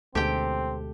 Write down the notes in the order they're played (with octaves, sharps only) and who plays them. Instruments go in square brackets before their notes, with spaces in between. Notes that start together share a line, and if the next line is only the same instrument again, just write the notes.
[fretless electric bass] D2 [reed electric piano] B2 G#3 A4 [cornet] C4 [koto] G4 G5